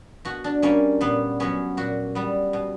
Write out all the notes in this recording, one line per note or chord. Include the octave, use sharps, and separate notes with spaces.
B2 F#4
D4
G3 A#3 C#4
A#2 B3
F#3 B3 C#4
A#2 F#4
G3 B3
B2